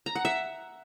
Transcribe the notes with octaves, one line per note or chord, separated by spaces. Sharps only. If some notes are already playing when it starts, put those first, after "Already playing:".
A#5
F#5
E5